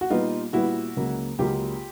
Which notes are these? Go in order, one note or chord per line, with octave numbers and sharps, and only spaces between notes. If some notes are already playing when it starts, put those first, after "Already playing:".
F#4
A#2 G3 B3 D#4 F4
A#2 G3 B3 E4 F#4
C#2 C#3 F#3 A#3
C#2 C#3 F#3 A#3 F4 G4